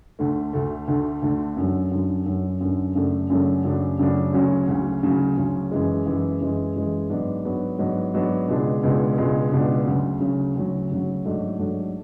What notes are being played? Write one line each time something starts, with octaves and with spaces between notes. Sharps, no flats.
D2 D3 A3
D2 D3 A3
D2 D3 A3
D2 D3 A3
F#2 D3 F#3
F#2 D3 F#3
F#2 D3 F#3
F#2 D3 F#3
F#2 C#3 F#3 A3 D4
F#2 C#3 F#3 A3 D4
F#2 C#3 F#3 A3 D4
F#2 C#3 F#3 A3 D4
D2 C#3 F#3 C#4
D2 C#3 F#3 C#4
D2 C#3 F#3 C#4
D2 C#3 F#3 C#4
F#2 E3 G#3
F#2 E3 G#3
F#2 E3 G#3
F#2 E3 G#3
G#2 F#3 B3 D4
G#2 F#3 B3 D4
G#2 F#3 B3 D4
G#2 F#3 B3 D4
C#2 B2 G#3 D4
C#2 B2 G#3 D4
C#2 B2 G#3 D4
C#2 B2 G#3 D4
D2 C#3 F#3
D2 C#3 F#3
D2 C#3 F#3
D2 C#3 F#3
G#2 F#3 A3 D4
G#2 F#3 A3 D4